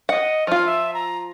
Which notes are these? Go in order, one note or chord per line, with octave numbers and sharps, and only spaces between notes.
D#5 F#5
F3 F4 F6
E5
A#5